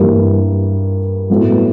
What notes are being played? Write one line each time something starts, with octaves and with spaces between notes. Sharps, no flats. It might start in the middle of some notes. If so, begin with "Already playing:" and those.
Already playing: G2 E3 G3 A#3
A2 F#3 B3 E4